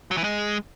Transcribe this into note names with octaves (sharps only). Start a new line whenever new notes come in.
F#3
E3
G#3